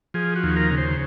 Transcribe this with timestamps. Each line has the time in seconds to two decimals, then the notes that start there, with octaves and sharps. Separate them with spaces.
0.14 F3 G#4
0.36 F#4
0.43 D#2
0.56 A#4
0.71 C#3
0.78 C5